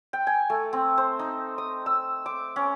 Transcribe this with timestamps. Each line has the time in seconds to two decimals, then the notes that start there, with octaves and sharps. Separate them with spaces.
0.13 G5
0.27 G#5
0.50 A3
0.73 C4
0.98 C5
1.19 D#4
1.58 D#6
1.86 E6
2.26 D6
2.56 C#4